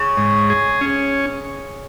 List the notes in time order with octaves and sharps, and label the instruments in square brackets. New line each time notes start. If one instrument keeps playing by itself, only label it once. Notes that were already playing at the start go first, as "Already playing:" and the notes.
Already playing: [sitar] C#3
[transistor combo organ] G#2
G#4
C#4